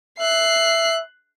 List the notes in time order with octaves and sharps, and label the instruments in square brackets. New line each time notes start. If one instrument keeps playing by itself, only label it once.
[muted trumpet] E5 [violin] F#6 C7